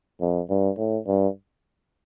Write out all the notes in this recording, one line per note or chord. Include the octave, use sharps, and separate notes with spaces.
F2
G2
A2
G2